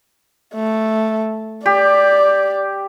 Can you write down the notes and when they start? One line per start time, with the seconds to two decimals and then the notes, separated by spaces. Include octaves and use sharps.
0.54 A3
1.66 G4 D5